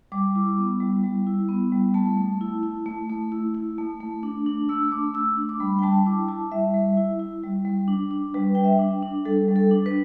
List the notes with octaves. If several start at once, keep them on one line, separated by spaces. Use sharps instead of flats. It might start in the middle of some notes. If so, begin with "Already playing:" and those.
G3 D6
E4
B3
G3
G3
E4
B3
G3
A3 A5
A3
E4
E4
A3
A3
E4
E4
A3
A3
D4
D4
A3 E6
A3 D6
D4 E6
D4
D6
G3 B5
G5
G3 A5
E4 D6
E4 A5
G3 E5
G3
E4
E4
G3
G3
D4
D4
G3 B4
G3 G5
E5
D4
D4
G3 A4
G3
A4
D4
B4